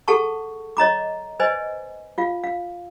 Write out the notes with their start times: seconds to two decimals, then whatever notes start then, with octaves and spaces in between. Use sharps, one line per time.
0.08 G#4 A4 F#5 A5 C#6
0.77 C#5 D#5 A#5 D6
1.40 B4 C5 D5 D#5 G#5
2.18 F4 F5
2.44 F5